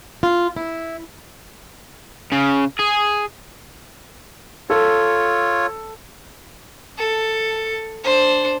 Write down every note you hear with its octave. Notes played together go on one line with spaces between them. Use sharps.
F4
E4
C#3
G#4
F4 A4 C#5
A4
D4 C5